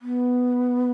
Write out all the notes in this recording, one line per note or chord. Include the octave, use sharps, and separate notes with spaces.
B3